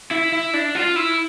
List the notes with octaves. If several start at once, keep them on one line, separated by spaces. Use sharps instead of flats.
E4
E4
D4
F4
E4